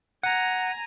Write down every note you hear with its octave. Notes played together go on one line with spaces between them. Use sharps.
F#5 G#5 A#5